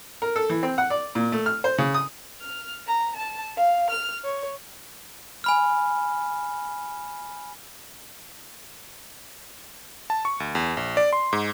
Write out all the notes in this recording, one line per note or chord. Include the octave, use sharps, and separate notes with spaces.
A#4
A4
E3
C4
F#5
D5
A#2
A3
F6
C5
C#3
D#6
F6
A#5
A5
F5
F6
C#5
G#5 B5 F6
A5
C#6
D2
E2
A#1
D5
C6
G#2